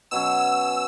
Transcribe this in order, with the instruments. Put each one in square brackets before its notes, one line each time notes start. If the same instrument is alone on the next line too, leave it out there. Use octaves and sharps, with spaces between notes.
[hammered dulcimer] B2 F#3 C#4 [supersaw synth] E6
[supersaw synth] E6